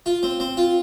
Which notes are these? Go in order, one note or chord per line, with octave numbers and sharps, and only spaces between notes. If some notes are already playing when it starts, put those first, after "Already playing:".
F4
C4
C4
F4